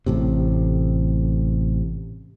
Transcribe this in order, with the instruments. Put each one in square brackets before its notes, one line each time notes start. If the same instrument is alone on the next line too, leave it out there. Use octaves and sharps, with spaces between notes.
[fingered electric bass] A1 A2 C3